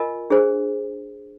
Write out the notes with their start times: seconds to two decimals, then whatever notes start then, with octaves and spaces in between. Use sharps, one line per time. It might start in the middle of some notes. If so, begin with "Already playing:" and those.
Already playing: F4 A#4 D#5 G#5
0.30 D4 G#4 C5